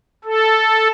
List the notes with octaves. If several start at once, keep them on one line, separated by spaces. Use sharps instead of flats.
A4